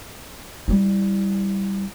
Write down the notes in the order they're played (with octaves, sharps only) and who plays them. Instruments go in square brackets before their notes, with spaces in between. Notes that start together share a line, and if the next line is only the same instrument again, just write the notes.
[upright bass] G3 E4